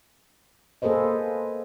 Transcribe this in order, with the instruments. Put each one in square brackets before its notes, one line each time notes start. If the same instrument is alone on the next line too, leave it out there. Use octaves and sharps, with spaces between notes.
[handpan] A#3 G#4 A4 B4 C5 D#5